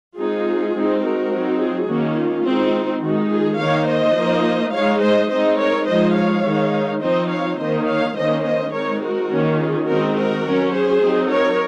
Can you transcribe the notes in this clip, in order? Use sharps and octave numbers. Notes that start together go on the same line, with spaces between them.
G#3 C4 D#4 F4 G#4
G#3 C4 D#4
F#4 A#4
F#3 C4 D#4
F4 G#4
D#3 A#3 C#4 F#4
F4
G#3 C4 D#4
D#3 G#3 D#4 F#4
F4 G#4
D#3 A#3 D#4 C#5 F5
C5 D#5
F3 A#3 D#4
G#3 D#4 C#5 F5
C5 D#5
G#3 C4 D#4 C5 D#5
A#4 C#5
F3 G#3 D#4 C5 D#5
C#5 F5
D#3 G#3 D#4
F3 C4 D#4 C5 D#5
C#5 F5
D#3 A#3 D#4 C5 D#5
C#5 F5
D#3 A#3 C#4 C5 D#5
C5 D#5
G#3 C4 D#4 A#4 C#5
F#4 A#4
D#3 A#3 C#4
F4 G#4
D#3 G#3 C4 D#4 F#4 A#4
F#4 A#4
F#3 C#4
G#4 C5
F#3 C4 D#4
A#4 C#5